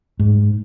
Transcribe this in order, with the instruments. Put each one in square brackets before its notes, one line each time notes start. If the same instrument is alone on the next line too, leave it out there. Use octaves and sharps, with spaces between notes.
[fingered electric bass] G#2